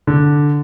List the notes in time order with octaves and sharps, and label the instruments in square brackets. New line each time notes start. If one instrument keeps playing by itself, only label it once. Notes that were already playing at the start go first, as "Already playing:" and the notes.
[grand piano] D3